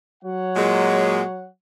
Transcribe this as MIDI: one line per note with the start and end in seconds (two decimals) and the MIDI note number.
0.24 1.48 54
0.24 1.48 73
0.24 1.48 78
0.56 1.21 46
0.56 1.21 56